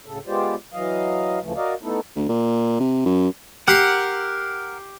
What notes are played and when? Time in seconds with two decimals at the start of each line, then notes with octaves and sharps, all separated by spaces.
0.06 D2 A2 C#3 A4
0.27 G#3 B3 F4 G4 C5 D5
0.73 E3 F#3 D#5 F5
1.42 D2 C#3 E3 F3 A3
1.56 F#4 A#4 D5 D#5 F5
1.83 A3 B3 D#4 E4 A4
2.16 D2
2.29 A#2
2.80 C3
3.06 F#2
3.68 G4 A#4 F#5 C6